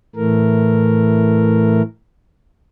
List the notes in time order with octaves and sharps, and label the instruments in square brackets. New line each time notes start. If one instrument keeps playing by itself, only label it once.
[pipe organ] A2 E3 A3 A#4